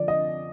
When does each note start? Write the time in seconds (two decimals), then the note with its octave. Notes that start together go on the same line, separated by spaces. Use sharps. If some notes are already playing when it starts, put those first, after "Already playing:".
Already playing: D3 F3 D5
0.08 D#5